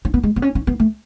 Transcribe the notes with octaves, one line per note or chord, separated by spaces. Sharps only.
C#4
B3
G#3
B3
C#4
C#4
B3
A3